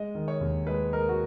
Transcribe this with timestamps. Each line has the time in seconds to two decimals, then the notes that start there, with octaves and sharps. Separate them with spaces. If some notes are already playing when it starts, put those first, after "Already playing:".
Already playing: G#3 D#5
0.15 D#3
0.28 C#5
0.41 D#2
0.67 G#3 B4
0.93 G#3 A#4
1.09 F#4